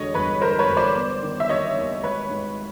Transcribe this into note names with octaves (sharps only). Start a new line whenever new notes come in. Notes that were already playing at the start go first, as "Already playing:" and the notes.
Already playing: E1 D3 C#5 D#5
G1 B4 C#5
D3 A#4 C5
B4 C#5
G1
C5 D5
B3
D#3
E5
D#2 C#5 D#5
D#2
G#1 B4 C#5
G#2